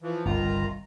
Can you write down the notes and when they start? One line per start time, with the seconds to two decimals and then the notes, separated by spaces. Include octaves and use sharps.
0.02 E3 F3
0.25 G1 C2 D#3 F4 A#5